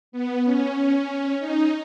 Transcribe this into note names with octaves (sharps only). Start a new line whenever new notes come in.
B3
C#4
C#4
D#4